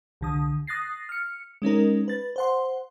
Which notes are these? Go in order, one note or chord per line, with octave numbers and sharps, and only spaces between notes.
C2 D3 D#6
D#6 F#6 A6 A#6 C7
F6 C#7
G#3 C#4 D#4 A#4
B4 A6
C5 F#5 C6